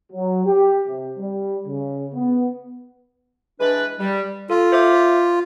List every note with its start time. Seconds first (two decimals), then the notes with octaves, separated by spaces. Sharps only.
0.11 F#3
0.46 G4
0.87 C3
1.19 G3
1.67 C#3
2.14 B3
3.60 E3 G#3 D4 B4
3.99 G3
4.50 F4 A4
4.72 C5 E5 D6